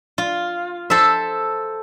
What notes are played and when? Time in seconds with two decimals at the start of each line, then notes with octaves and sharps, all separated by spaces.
0.18 F4
0.90 A4 C5 E5